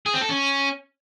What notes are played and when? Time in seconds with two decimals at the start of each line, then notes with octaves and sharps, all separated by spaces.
0.06 G#4
0.14 C4
0.21 A4
0.29 C#4